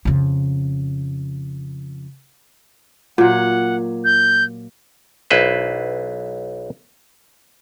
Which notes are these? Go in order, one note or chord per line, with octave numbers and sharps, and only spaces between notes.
F2 C#3
A#2 F#3 F#5
G6
B1 E4 B4 C5